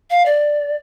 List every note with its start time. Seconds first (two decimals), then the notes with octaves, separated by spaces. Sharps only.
0.11 F5
0.26 D5